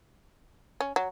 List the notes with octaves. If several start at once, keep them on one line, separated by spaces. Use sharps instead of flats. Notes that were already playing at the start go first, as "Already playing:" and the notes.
C#4
F#3